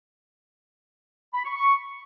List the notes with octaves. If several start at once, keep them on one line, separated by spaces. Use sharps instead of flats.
B5
C#6
C#6